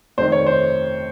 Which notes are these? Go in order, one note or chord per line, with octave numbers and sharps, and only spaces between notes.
F1 F2 D#3 C5
C#5
C5